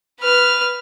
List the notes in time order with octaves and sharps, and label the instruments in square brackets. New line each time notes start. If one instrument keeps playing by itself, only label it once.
[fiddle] B4 F6